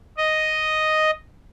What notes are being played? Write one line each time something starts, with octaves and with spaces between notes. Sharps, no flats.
D#5